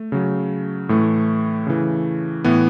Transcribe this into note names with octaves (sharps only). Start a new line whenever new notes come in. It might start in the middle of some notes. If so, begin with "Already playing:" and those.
Already playing: A3
C#3 F#3
A2 E3 A3
C#3 E3
A2 E3 B3